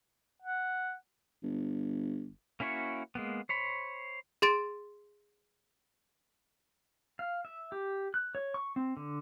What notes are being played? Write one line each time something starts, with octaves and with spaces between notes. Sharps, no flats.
F#5
G1
A#3 C#4 E4 F#4 C#5
G#3 A#3 B3
C5 C#5 B5
G#4 C6 A6 D7
F5
E5
G4
F#6
C#5
C#6
C4
D3